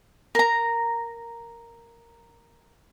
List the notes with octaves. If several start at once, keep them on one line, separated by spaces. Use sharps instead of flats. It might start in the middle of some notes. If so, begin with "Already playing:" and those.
A#4 A#5